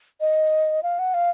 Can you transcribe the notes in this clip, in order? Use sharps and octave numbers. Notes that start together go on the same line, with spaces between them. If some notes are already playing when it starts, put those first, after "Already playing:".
D#5
F5
F#5
F5